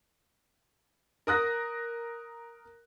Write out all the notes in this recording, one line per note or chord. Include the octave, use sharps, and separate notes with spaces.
A#4 D#6 F#6 A#6